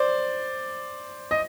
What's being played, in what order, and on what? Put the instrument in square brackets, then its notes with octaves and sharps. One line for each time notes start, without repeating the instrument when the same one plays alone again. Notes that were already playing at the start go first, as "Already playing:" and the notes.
Already playing: [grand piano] C5 D5
D#5